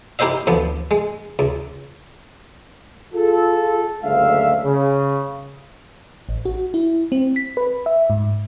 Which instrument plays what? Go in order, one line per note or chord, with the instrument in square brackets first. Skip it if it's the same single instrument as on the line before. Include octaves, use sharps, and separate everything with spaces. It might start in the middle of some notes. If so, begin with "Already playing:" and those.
[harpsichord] E4 G4 A#4 C5 D#5 E5
D2 F3 B3
G#3
C#2
[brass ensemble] F4 G#4 A4
F#1 D2 D3 G#3 E5 F5
C#3
[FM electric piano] A1
F#4
E4
C4
B6
B4
E5
G#2